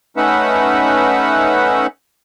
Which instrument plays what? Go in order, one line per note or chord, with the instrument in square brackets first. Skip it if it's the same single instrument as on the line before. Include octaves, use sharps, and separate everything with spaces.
[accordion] A3 C#4 D#4 B4 E5 F#5